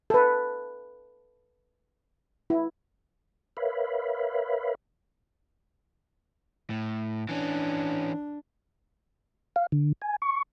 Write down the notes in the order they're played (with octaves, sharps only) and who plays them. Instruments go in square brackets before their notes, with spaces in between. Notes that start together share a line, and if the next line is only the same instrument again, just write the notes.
[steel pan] A4 B4
E4
[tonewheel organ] A#4 B4 C#5 E5 F5 B5
[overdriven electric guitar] A2
[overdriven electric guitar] E3 C#4 [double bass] D4
[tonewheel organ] F5
D3
G#5
C#6